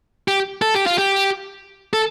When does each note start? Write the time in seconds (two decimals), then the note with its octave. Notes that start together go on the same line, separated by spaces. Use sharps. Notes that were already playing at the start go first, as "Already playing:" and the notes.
0.28 G4
0.62 A4
0.75 G4
0.86 F4
0.98 G4
1.93 A4